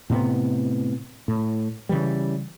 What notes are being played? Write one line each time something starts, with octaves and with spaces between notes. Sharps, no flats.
A2 C3 B3
A2
C#3 E3 G3